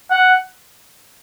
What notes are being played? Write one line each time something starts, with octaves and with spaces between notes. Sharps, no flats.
F#5